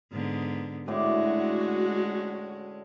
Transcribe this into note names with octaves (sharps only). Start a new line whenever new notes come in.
G#2 D3 B3
A2 D3 G#3 C#4 F#4 D5